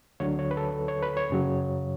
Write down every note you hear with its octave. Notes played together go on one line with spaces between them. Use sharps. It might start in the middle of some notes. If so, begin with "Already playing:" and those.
D2 D3 F#3 C#5
C#5
B4
A4
C#5
B4
C#5
F#2 C#3 F#3